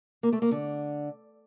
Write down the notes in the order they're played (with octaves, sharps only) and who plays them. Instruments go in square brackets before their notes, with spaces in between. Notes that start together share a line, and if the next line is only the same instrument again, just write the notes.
[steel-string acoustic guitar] A#3
A3
A#3
D3